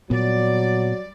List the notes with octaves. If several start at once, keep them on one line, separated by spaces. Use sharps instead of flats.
A#2 F#3 G3 B3 D5